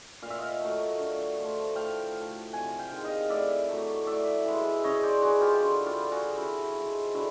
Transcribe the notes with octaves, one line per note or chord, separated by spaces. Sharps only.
A#2 F5
E5
D#5 F5
F#3 A3
D3
F3 A3
A2 F5 G5
F#3
A3
C3 F#5 G#5
F5 G5
D#3 G#3
D#5 F5
A2 D5 E5
F#3 A3
A2 D5 E5
E3 G#3
C#3 C#5 D#5
C5 D5
E3 G#3 F#4 G#4
F4 G4
D3 E4 F#4
F4 G4
G3
F#4 G#4
C#3 E4 F#4
F3 G#3
D3 E4 F#4